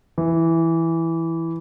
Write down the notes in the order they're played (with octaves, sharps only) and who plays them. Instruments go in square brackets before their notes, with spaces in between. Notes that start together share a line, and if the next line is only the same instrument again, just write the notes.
[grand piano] E3